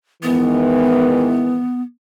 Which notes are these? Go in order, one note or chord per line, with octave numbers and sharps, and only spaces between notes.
G#2 D#3 E3 B3